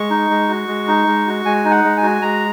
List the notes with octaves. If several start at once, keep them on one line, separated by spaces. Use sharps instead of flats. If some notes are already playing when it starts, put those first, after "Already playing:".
Already playing: G#3 C#6
D#4
G#3
F#4
G#3
D#4
G#3
F#4
G#3 G#5
D#4
F#5
G#3
G#5
F#4
G#3 A#5